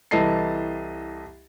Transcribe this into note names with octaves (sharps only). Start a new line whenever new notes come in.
C2 E3 A4 D#5 A5 C7